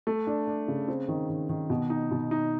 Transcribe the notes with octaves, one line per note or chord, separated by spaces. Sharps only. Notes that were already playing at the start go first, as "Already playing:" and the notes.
A3
D4
D4
C#3
C4
D#3
D#3
D#3
B2
D#4
B2
D#4